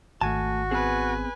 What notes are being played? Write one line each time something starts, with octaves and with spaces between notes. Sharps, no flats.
G#1 A3 F#4 G#5 A5
B3 C4 G#4 B4 G#5